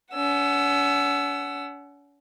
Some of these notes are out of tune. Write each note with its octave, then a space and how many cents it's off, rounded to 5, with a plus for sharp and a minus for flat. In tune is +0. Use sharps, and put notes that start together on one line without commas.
C#4 +45 F#5 +10 E6 +15